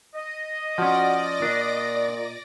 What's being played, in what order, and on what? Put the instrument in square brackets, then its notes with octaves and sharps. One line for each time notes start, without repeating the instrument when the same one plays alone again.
[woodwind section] D#5
[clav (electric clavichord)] F3 C#4 [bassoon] F#4 [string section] D5 A#6
[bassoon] A#2 [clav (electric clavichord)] D4